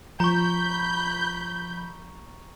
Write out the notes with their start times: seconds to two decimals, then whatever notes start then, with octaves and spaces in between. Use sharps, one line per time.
0.20 F3 A#5 B5 C#6 G6